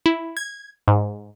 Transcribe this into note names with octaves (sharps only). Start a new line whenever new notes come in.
E4
G#6
G#2